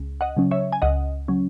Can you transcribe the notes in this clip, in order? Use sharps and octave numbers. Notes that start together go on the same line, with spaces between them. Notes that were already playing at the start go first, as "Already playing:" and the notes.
Already playing: C#2
D#5 F#5
C#3 F#3 C#4
C#5 E5
G#5
C#2 D#5 F#5
C#3 F#3 C#4